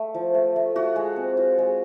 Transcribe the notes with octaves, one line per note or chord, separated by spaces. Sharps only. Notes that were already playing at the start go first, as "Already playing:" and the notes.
Already playing: A3
F3
A3
A3
F4 F#4
G#3
C4
F4
G#3